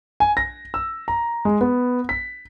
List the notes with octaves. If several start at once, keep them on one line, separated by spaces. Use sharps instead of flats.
G#5
A#6
E6
A#5
G#3
B3
B6